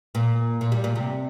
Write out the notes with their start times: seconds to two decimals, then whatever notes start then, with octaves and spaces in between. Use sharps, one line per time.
0.15 A#2
0.61 A#2
0.72 G3
0.84 A#2
0.96 C3